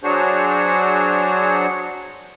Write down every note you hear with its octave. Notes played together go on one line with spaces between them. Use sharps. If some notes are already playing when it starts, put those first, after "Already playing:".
F#3 D4 F#4 G#4 C5 C#5